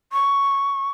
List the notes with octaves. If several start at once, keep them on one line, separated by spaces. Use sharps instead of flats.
C#6